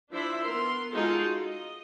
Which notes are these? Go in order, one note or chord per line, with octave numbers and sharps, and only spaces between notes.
F3 D4 E4 C5 E5 B5
B3 A#4 C6
G#3 D#4 F4 F#4 G#4 A4
D#5